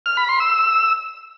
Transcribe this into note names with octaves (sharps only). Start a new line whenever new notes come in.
F6
B5
C6
E6